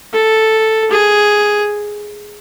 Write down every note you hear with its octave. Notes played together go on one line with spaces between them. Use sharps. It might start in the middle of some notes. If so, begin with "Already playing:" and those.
A4
G#4